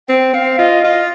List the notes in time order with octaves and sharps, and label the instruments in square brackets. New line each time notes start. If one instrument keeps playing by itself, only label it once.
[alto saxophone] C4 [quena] G5
[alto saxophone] C4 [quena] F5
[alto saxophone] F4 [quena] D#5
[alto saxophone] F4 [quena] D#5